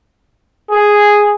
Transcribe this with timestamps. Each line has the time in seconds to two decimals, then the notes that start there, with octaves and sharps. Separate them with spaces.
0.71 G#4